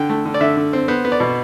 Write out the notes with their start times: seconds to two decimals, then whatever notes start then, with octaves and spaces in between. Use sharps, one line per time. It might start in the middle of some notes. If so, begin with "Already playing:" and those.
Already playing: D3 G5
0.10 A3
0.26 D3
0.34 D5
0.41 D3 E5
0.57 D3
0.73 C4
0.88 B3 C5
1.05 B3
1.12 D5
1.20 B2